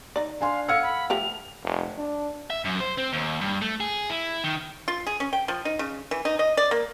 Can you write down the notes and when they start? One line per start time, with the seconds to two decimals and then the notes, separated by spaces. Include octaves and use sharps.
0.16 D#4 D5
0.41 D4 F5 G#5 C6
0.68 A4 F5 F#5 E6 F6 G#6 C#7
0.83 B5
1.10 F3 A3 G4 F7
1.64 F1
1.98 D4
2.50 E5
2.65 F#2
2.80 C5
2.98 C4
3.13 D#2
3.41 G2
3.62 A3
3.80 G#4
4.10 E4
4.44 D#3
4.88 F4
5.07 G#4
5.20 C#4
5.33 G5
5.48 F3
5.65 D#4
5.79 C#3
6.11 E3
6.25 D#4
6.39 D#5
6.57 D5
6.71 A#3